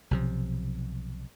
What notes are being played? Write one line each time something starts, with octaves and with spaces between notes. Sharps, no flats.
B1 C3 F3